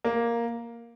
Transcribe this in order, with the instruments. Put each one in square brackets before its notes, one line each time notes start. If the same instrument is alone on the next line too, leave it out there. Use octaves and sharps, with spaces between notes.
[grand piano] A#3